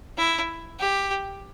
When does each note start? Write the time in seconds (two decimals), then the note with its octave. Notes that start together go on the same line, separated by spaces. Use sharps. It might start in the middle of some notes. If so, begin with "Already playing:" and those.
0.18 E4
0.80 G4